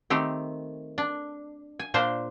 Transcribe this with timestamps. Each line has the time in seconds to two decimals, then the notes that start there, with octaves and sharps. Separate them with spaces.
0.10 D#3 A3 C4 G4
0.98 D4
1.79 G#5
1.94 A#2 D4 C5 F5